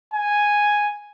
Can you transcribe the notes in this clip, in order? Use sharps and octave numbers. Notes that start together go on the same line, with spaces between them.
G#5